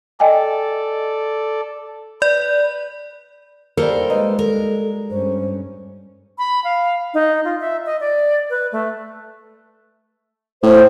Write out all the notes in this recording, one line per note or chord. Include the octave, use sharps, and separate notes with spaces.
A4 D5 D#5 G5 G#5
B4 D5
G3 A#3 A4 A#4 C5
G#3 D#4 B4
A4 A#4
G2 C#4 C5
B5
F5
D#4
F4
E5
D#5
D5
B4
A3
A2 C5